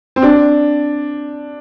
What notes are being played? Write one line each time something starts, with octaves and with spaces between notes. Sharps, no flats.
C4
D4